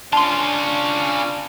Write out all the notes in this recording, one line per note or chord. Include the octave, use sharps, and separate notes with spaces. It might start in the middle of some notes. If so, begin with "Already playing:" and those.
C#4 D4 F4 A5 C6